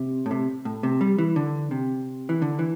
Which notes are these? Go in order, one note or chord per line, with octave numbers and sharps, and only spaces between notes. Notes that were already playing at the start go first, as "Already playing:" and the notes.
Already playing: C3
A2
C3
A2
C3
G3
E3
D3
C3
E3
D3
E3